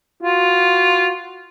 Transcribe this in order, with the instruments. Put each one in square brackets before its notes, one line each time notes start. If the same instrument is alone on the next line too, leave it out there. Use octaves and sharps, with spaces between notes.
[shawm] F4 [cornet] F#4